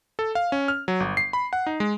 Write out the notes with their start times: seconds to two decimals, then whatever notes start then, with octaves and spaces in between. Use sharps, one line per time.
0.19 A4
0.35 F5
0.52 C#4
0.68 F6
0.88 F#3
1.00 G1
1.17 C7
1.33 B5
1.53 F#5
1.67 D#4
1.80 G#3